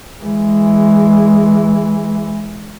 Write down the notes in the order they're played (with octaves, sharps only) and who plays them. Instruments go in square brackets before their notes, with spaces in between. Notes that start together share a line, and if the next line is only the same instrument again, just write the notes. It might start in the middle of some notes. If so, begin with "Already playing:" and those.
[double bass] E3 G#3